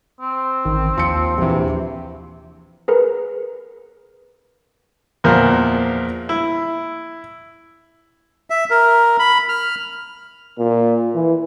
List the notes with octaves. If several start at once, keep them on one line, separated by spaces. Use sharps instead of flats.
C4
A1 D#3
D#2 F3 C6 C#7
A#1 C3 E3
G#4 A#4 B4
E2 A#2 F3 A#4
E4
E5
A#4
B5
F6
A#2
E3